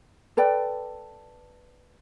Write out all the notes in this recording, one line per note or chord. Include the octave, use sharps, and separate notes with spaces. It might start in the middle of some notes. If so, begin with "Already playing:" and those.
A4 B4 D5 G5